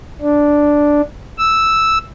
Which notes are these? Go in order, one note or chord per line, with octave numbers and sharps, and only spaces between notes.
D4
E6